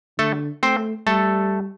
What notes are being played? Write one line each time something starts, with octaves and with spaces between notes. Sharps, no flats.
D3 A3 A4
A3 C4 C5
G3 A3 A4